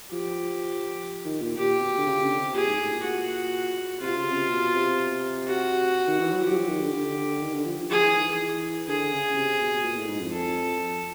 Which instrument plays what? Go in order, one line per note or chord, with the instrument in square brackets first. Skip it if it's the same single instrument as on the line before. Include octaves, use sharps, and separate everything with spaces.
[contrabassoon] F3 [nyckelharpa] G4
[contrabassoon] D#3
A#2
[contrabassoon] A#2 [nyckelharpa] G4
[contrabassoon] B2
D3
C#3
D3
C3
[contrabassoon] A#2 [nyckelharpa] G#4
[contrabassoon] G#2
A2
A#2
[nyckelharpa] F#4
[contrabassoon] C3 [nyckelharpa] F4
[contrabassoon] C#3
C3
B2
C3
[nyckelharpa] F#4
[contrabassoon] D#3
E3
F#3
[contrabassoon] F3 [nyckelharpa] G4
[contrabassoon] F#3
F3
D#3
D3
D3
D3
D#3
D3
F3
F3
[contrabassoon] F3 [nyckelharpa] G#4
[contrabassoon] E3
D#3
E3
[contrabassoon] D3 [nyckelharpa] G#4
[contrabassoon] C#3
C3
B2
A#2
A2
G#2
F2
[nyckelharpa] A4